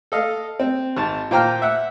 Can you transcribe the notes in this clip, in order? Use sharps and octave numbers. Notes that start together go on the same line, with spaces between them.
A4 D#5 F5
C4
G#1 A5
A#2 F4 C5 G5 A#5 F6
E5 F#5